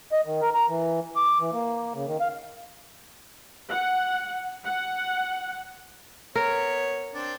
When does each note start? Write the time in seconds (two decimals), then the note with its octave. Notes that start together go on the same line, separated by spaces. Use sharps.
0.12 D#5
0.26 D#3
0.41 A#4
0.54 A#5
0.69 E3
1.16 D6
1.40 E3
1.53 A#3
1.94 C#3
2.08 D#3
2.20 F5
3.71 F#5
4.66 F#5
6.36 B3 A#4 C#5
7.14 C4 D4